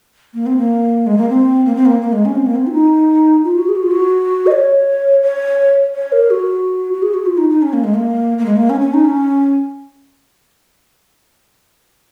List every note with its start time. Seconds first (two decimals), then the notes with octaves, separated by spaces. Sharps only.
0.34 A#3
0.46 C4
0.57 A#3
1.07 G#3
1.18 A#3
1.29 C4
1.65 A#3
1.76 C4
1.86 A#3
2.02 A#3
2.13 G#3
2.25 C#4
2.36 C4
2.46 A#3
2.56 C4
2.67 F4
2.72 D#4
3.44 F4
3.56 F#4
3.69 G#4
3.76 F#4
3.83 F4
3.91 F#4
4.47 D#5
4.52 C#5
5.23 C#5
5.95 C#5
6.12 A#4
6.31 F#4
6.93 F#4
7.02 G#4
7.14 F#4
7.26 F4
7.37 D#4
7.50 D#4
7.62 C#4
7.73 A#3
7.84 G#3
7.94 A#3
8.38 A#3
8.46 G#3
8.57 A#3
8.70 C#4
8.81 C#4
8.93 D#4
9.04 C#4